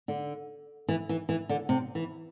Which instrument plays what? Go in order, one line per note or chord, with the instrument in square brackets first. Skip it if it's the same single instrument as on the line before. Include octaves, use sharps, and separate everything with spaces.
[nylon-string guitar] D3
E3
E3
E3
D3
C3
E3